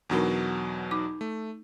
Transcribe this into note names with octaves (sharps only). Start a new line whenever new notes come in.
E2 B2 F#3 D4 D#4 A#4
D#4 D6
A3